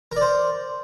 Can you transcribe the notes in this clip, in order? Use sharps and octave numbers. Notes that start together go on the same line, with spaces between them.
A#4 C5 D5